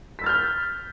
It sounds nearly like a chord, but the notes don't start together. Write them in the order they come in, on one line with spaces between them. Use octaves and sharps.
B6 E6 A6 F6 G6